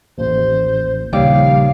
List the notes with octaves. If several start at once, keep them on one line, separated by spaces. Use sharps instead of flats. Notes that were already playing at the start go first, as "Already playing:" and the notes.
A1 D#2 C5
A#1 D#2 C#3 G3 C#5 F5 G5 D6